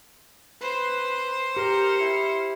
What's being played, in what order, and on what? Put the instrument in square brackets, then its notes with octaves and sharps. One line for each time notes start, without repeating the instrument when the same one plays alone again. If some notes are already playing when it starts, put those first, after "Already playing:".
[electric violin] B4 [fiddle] C5
[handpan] G4 [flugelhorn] A#4 [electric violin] F6 C#7
[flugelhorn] E4